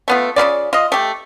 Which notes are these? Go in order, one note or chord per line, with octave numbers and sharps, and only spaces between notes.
A3 B3 F4
C#3 B3 F4 D5
F4 D#5
A3 G4